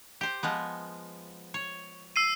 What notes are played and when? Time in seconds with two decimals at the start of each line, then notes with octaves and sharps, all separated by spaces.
0.21 G4 C5
0.43 F3 G#3 B3
1.54 C#5
2.16 E6 C7 D#7